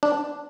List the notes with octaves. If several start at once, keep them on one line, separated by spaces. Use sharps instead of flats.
D4